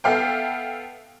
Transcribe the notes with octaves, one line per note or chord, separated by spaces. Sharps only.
B3 A4 E5 F5 G5